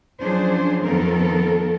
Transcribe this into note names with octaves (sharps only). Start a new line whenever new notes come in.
F3 F#3 C#4 D4 G#4 C5
F2 D#3 F3 B3 A4 A#4